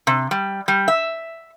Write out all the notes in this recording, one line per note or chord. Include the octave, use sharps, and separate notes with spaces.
C3
G3
G3
E5